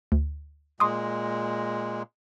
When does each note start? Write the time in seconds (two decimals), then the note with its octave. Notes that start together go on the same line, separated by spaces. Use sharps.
0.12 D2
0.80 A#2 G#3 C6 D6 D#6